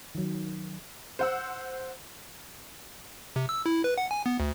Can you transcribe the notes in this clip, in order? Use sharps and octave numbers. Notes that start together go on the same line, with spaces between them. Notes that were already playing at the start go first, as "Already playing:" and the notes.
D#3 F#3
C5 F#5 E6
C3
E6
E4
B4
F#5
G#5
B3
D2